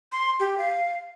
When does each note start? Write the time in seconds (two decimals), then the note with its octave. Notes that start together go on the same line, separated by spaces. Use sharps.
0.12 C6
0.40 G4
0.58 F5